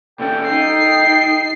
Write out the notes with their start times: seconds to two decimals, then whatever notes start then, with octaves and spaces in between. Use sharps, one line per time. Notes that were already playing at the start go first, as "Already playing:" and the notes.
0.20 A#2 C#4 A4 G5
0.49 D#4 C7